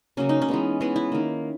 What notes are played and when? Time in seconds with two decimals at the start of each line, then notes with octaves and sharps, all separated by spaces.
0.17 C#3 F#3 A#3 C#4
0.29 D#4
0.42 C#4
0.49 E3 G#3 B3
0.80 E3 G#3 B3
0.96 E4
1.12 D#3 A#3